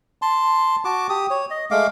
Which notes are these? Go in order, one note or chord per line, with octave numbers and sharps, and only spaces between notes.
A5 C6
F#4 A5 D6
G4 D#6
C#5
D#5
G#3 A3 F5 D6